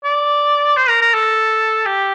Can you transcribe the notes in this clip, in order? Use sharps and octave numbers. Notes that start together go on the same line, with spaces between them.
D5
C5
A#4
A#4
A4
G4